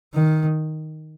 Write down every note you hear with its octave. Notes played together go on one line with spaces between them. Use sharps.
D#3